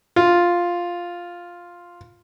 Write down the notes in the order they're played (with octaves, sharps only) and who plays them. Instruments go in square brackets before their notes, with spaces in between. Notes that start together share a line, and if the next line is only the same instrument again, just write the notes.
[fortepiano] F4